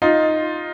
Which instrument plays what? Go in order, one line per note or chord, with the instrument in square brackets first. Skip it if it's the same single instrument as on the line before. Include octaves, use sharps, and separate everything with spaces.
[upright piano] D#4 F4